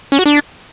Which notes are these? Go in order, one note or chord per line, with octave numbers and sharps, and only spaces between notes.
C#4
F#4
D4